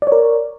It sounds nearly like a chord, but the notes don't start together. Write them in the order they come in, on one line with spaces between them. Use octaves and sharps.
D5 C#5 A#4